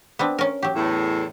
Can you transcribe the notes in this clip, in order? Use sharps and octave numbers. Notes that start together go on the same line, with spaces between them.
B3 C4 D4
C#4 A#4
F#3 G4
E2 A2